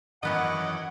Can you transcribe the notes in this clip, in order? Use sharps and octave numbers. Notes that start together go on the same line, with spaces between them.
F#2 D#3 E3 B3 C#4 D#5 F#5 D6